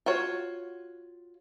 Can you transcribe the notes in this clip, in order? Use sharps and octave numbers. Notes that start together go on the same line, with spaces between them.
F4 F#4 C#5